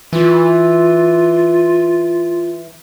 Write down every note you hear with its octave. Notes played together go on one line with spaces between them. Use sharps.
E3 F4